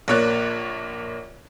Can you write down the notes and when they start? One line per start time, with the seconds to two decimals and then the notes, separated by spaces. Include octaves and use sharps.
0.08 A#1 A#3 C#5 D5 F#6